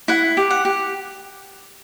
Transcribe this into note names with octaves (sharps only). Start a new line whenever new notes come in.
E4 F#5
G4
F#5
G4